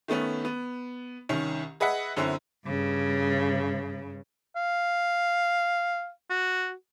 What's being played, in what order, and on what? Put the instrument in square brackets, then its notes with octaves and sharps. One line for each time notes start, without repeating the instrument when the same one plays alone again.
[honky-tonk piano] D#3 A3 B3 C#4
B3
C2 D#3 C#4
G#4 B4 D#5 E5 F#5
F#2 D3 C4 C#4 E4
[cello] G2 C#3
[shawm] F5
F#4